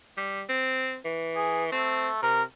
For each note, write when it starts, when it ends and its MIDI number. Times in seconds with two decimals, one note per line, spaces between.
0.17 0.43 55
0.49 0.97 60
1.05 1.68 52
1.36 1.64 68
1.72 2.20 57
1.72 2.08 60
2.22 2.44 48
2.22 2.43 70